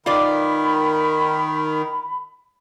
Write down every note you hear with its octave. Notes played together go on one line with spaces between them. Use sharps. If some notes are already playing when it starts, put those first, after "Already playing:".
D#3 F4 B4 D5 B5